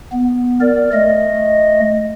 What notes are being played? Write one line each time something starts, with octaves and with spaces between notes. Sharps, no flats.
B3
A#4 D5
A3 D#5